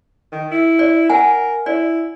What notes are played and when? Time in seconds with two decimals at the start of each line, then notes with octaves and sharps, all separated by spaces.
0.32 D#3
0.51 E4
0.79 D5
1.10 A#4 F#5 G#5
1.66 E4 D5